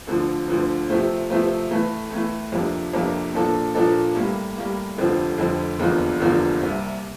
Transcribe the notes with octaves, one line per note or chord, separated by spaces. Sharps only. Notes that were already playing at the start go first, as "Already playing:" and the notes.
D2 D3 F3
D2 D3 F3
C3 F3 A3 C4
C3 F3 A3 C4
A2 E3 A3
A2 E3 A3
F2 C3 F3 A#3 D4
F2 C3 F3 A#3 D4
A#2 F3 A#3 D4 A4
A#2 F3 A#3 D4 A4
A2 G3 A#3
A2 G3 A#3
F1 F2 D3 F3 C4
F1 F2 D3 F3 C4
F1 E2 D3 F3 A#3
F1 E2 D3 F3 A#3
C2 C3 G3 A#3